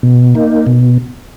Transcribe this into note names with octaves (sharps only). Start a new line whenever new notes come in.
B2
A#3 D#4
B2